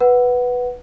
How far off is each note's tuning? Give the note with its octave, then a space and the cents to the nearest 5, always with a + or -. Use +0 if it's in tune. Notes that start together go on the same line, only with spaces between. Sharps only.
B4 +0 F#5 +0